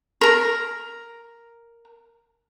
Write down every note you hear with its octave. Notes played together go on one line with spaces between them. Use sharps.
A#4 A#5